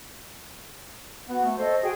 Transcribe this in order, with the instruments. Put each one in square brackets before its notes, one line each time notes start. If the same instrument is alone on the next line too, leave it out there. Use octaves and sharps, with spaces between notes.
[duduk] B3 [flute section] F#4 F#5
[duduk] A3
[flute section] A4 D#5 [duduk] C5
[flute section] F#4 G#4 G5